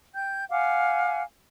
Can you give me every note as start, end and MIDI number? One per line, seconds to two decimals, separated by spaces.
0.14 0.44 79
0.14 0.44 91
0.50 1.22 77
0.50 1.22 78
0.50 1.22 80
0.50 1.22 86